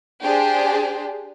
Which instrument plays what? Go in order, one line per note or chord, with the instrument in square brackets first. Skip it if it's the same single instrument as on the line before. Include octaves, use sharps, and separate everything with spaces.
[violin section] D4 G4 G#4 C5